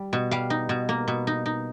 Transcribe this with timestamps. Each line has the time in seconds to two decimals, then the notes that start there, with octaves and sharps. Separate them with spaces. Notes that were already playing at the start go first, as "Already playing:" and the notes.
Already playing: G3
0.13 B2
0.31 G3 F5
0.50 D#4
0.69 B2
0.89 A#3
1.08 B2
1.27 D#4
1.46 D#4